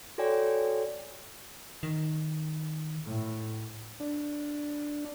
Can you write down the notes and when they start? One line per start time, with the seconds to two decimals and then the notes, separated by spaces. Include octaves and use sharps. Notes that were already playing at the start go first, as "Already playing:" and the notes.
0.18 F#4 A4 C#5 D5 G5 G#5
1.83 D#3
3.05 A2
4.00 D4